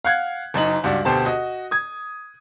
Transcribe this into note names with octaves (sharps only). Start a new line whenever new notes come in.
F5 F#5 F#6 G#6
F#1 F#2 D#4 F#7
C#2 G2 F#4 D5
D2 B2 G4 C5 A5
F#4 D#5
D#6 G#6